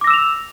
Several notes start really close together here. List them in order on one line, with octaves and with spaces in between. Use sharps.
D6 A#6 E6 E7 F7